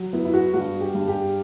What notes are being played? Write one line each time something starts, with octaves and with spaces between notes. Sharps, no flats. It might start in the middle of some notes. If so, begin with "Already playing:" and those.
Already playing: F#3
B3 E4
E4
F#4
G2 F#4
G4
G2
G4